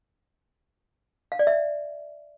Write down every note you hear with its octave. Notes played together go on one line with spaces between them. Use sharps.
F5
D5
E5